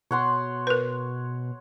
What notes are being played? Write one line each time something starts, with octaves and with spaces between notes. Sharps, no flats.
B2 C#5 F#5 C6
A#4 B4